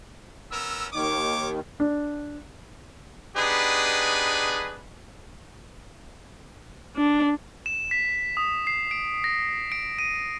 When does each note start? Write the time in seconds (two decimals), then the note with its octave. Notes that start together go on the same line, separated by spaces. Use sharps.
0.51 B3 C#4 A#4 E6
0.93 D#2 D#3 C#5 D6
1.80 D4
3.36 B3 D4 D#4 G4 G#4 B4
6.97 D4
7.66 E7
7.91 B6
8.37 D#6
8.67 C7
8.91 D7
9.24 A#6
9.72 D7
9.99 D#7